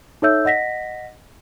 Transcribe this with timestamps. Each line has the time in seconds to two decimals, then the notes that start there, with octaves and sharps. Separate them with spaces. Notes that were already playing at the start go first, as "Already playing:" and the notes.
0.22 D#4 A4 C#5 E5 E6 G6
0.45 D#5 F#5 A#6 B6